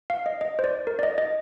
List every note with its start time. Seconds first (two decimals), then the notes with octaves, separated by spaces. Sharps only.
0.10 F5
0.26 D#5
0.41 D#5
0.59 C5
0.64 D5
0.87 A#4
0.99 D5
1.03 D#5
1.18 D#5